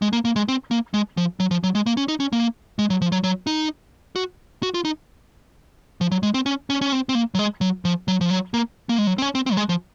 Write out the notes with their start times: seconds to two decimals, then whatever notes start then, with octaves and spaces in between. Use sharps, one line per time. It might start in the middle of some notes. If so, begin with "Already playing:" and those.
0.02 G#3
0.13 A#3
0.25 A#3
0.36 G#3
0.48 C4
0.71 A#3
0.94 G#3
1.17 F3
1.40 F#3
1.51 F3
1.64 F#3
1.75 G#3
1.86 A#3
1.97 C#4
2.08 D#4
2.20 C#4
2.33 A#3
2.79 G#3
2.90 F#3
3.02 F3
3.12 F#3
3.24 F#3
3.47 D#4
4.16 F#4
4.63 F#4
4.74 F4
4.85 D#4
6.01 F3
6.11 F#3
6.23 G#3
6.34 C4
6.46 C#4
6.70 C#4
6.81 C#4
6.92 C4
7.09 C4
7.15 A#3
7.35 F#3
7.39 G#3
7.61 F#3
7.85 F3
8.08 F#3
8.21 F3
8.30 F#3
8.54 A#3
8.89 A#3
8.98 G#3
9.07 F#3
9.18 C4
9.22 C#4
9.35 C4
9.46 C4
9.52 F#3
9.57 G#3
9.69 F3